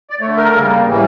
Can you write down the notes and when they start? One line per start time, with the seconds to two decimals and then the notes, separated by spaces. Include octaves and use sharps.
0.10 D5
0.21 A3 C#5
0.25 D3
0.37 A#4
0.53 C#3 G3 A#3
0.85 A2 E3 G3